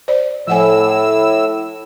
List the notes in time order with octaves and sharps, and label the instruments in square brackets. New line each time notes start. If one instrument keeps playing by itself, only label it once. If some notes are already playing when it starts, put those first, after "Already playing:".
[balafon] C5 D5
[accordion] A2 E6 [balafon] F3 F#5 G#5